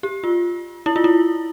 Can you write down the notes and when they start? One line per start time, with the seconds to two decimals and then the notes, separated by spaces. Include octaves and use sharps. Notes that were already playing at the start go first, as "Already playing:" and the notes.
0.03 G4
0.24 F4
0.86 E4
0.96 F4
1.04 E4